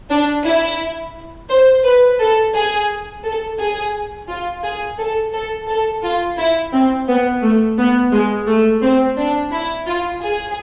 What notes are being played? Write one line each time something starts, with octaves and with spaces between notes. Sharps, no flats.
D4
E4
C5
B4
A4
G#4
A4
G#4
F4
G#4
A4
A4
A4
F4
E4
C4
B3
A3
B3
G#3
A3
C4
D4
E4
F4
G#4